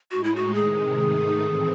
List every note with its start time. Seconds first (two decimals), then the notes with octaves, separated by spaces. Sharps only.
0.11 A2 G#3 D#4 F#4
0.24 E4
0.36 F#4
0.54 C3 D#3 G#3 G#4
0.98 G#2 D#3 A3 D#4
1.41 A2 E3 C4